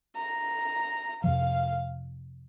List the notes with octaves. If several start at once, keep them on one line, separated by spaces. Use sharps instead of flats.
A#5
F2 C3 F3 F5